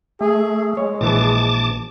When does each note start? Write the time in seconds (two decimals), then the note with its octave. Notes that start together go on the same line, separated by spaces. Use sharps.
0.21 A3 G#4
0.77 G#3 C#5
1.01 A#1 E3 A5 D6